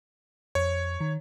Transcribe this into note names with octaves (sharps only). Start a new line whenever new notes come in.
F2 C#5
D#3